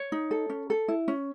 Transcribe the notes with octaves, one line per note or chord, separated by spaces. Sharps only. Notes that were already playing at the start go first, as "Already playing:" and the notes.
Already playing: C#5
D#4
A4
C#4
A4
E4
C#4